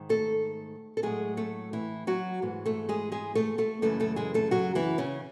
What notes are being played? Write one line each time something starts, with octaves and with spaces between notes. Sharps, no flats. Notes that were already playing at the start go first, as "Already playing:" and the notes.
Already playing: G#2 D#3
A3 A4
A4
A2 F#3 G#3 A3 G#4
A3 A4
E3 E4
F#3 F#4
G#2 E3 A3
A3 A4
G#3 G#4
G#3 G#4
A3 A4
A3 A4
F#2 C#3 E3 G#3 A3 A4
A3 A4
G#3 G#4
A3 A4
F#3 F#4
E3 E4
C#3 C#4